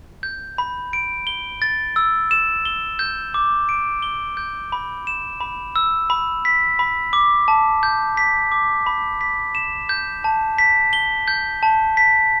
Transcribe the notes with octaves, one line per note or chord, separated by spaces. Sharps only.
G6
B5
D7
G7
A6
E6
E7
G7
G6
D6
D7
G7
G6
B5
E7
B5
E6
B5
B6
B5
D6
A5
G6
B6
D6
B5
B6
E7
G6
A5
B6
G7
G6
A5
B6